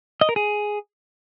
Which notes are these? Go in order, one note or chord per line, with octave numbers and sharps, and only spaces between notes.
D#5
A#4
G#4